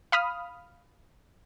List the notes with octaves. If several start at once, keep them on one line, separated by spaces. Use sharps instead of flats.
F5 B5 D#6 F6